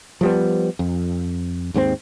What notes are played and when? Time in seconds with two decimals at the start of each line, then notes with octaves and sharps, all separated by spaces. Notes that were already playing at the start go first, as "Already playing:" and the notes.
0.21 F3 G3 B3
0.79 F2
1.74 D#2 G#2 B3 C4